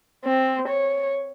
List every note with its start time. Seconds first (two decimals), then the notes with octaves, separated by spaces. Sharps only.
0.25 C4
0.68 C#5